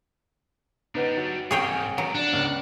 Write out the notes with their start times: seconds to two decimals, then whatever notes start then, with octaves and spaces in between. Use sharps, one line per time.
0.95 G3 D4 D#4 B4 F#5
1.17 F#3
1.51 C2 G#2 A#3 G#4 C#5 G5
1.98 F#3 G#3 D5
2.15 D4 F#5
2.33 C#2